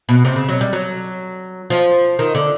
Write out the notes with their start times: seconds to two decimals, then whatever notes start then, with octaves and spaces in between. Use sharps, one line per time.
0.09 B2
0.25 C3
0.36 C#3
0.49 F#3
0.61 G3
0.73 F#3
1.70 F3
2.19 D#3
2.35 D3